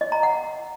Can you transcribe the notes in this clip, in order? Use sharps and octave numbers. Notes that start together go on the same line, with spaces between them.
D#5
A#5
F#5